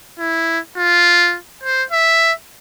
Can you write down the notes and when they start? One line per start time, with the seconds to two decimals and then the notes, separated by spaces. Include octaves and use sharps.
0.19 E4
0.77 F4
1.63 C5
1.92 E5